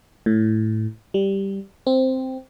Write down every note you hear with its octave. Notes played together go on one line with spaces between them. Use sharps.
A2
G3
C4